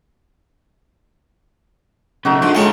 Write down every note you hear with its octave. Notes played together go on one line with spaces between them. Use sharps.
B1 C#3 A3 D#4 F#4
D3 F3 F#3 G#3
G#3 A4 C#5 F5 G5